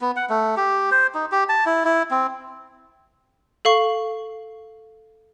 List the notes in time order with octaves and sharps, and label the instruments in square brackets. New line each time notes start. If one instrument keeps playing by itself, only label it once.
[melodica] B3
F#5
A3
G4
C5
D#4
G4
A5
E4
E4
C4
[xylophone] A4 F5 C#6